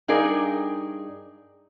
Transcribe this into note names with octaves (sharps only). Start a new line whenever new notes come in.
G2 D#4 G#4 A#4 D5